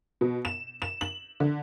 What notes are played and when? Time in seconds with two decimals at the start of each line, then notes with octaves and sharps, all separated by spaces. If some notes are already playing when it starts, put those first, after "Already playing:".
0.21 B2
0.45 E7
0.82 E7
1.01 F#7
1.40 D3